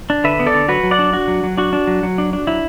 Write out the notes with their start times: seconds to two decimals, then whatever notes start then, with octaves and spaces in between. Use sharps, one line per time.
0.10 D4
0.24 D3 B4 E5
0.40 B3
0.47 A4 D5
0.54 D3
0.68 F#3 F#4 B4
0.83 F#3
0.91 D5 F#5
0.99 D4
1.13 D4 F#4
1.28 F#3
1.43 F#3
1.57 D4 F#4
1.73 D4
1.87 F#3
2.03 F#3
2.18 D4
2.33 D4
2.47 F#3 E4